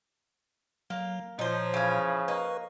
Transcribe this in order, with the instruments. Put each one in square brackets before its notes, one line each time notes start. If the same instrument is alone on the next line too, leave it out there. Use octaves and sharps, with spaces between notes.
[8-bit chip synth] F#3 [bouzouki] A#3
[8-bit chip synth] A#2 C#5 [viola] F3 [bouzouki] D#4 C5
[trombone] C#3 [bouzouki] E3 F5
[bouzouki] A#3 D#4 [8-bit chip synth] B4 C#6